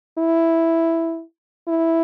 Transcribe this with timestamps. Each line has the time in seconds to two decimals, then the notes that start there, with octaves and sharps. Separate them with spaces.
0.19 E4
1.68 E4